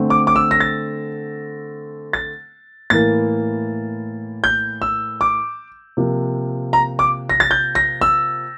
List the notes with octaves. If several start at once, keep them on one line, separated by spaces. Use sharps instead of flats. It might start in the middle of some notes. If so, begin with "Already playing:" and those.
Already playing: D3 A3 C4
D6
D6
E6
A#6
A6
A6
A2 E3 A#3 A6
G6
E6
D6
C3 F3 A#3
A#5
D6
A#6
A6
G6
A#6
E6